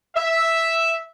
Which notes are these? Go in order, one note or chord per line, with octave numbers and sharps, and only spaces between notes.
E5